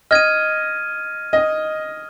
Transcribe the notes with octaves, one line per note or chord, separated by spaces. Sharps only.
D#5 F6 G#6 D#7
D#5